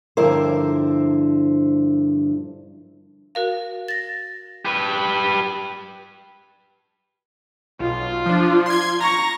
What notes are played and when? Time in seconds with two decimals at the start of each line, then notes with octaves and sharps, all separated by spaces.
0.17 G2 D3 F3 E4 A#4 C5
3.35 F#4 A#4 F5
3.88 A6 A#6
4.65 G4 B4
7.80 B1 F4
8.26 F3 D4
8.66 C6 G#6
9.01 A#5 C#6 A#6